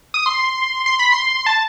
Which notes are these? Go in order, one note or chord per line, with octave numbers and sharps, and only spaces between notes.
D#6
C6
C6
B5
C6
A5